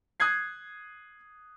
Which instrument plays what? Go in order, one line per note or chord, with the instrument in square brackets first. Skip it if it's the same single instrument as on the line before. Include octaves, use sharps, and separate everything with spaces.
[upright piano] D#6 F#6 G#6 C7